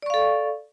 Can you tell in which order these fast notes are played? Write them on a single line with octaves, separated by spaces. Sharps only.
D5 C#6 F5 A4